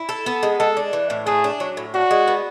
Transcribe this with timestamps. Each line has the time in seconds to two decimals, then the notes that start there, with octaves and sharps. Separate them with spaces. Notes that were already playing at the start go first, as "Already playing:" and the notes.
Already playing: E4
0.09 A4
0.26 B3
0.43 G#3
0.59 G#3 A4
0.77 D4
0.93 E3
1.10 A2
1.26 A3 G#4
1.44 D4
1.60 F#3
1.77 A2
1.94 D4 F#4
2.11 G#3
2.27 B3